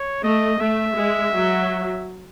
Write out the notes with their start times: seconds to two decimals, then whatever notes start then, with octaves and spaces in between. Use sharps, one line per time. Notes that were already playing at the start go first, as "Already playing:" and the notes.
Already playing: C#5
0.24 A3 D#5
0.60 A3 E5
0.96 G#3
1.34 F#3